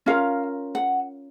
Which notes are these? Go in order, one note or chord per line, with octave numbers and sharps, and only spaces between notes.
C#4 F4 A#4 F5
F#5